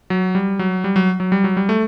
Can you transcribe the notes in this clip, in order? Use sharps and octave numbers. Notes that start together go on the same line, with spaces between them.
F#3
G3
F#3
G3
F#3
F#3
G3
F#3
G3
A3